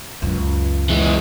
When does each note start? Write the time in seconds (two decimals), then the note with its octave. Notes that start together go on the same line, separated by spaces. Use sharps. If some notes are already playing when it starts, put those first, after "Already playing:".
0.22 C#2 F#2
0.89 E3 G#3